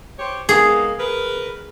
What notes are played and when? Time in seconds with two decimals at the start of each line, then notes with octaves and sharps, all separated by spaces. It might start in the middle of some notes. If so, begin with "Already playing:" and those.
0.19 G4 C5 C#5
0.49 G#3 A#3 B3 G#4
0.99 A#4 B4